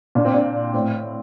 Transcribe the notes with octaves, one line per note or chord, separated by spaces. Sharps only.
A#2 D4
C4
D4
A2 C4